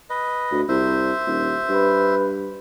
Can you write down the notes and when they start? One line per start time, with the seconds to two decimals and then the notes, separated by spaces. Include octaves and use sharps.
0.10 B4 D#5
0.51 D2
0.69 C2 C5 E5
1.27 D#1
1.69 G2 B4